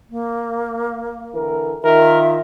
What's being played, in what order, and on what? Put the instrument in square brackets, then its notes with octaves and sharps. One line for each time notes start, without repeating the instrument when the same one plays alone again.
[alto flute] A#3
[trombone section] D3 E3 A#4
[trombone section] D#3 F4 [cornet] A#4 [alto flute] E5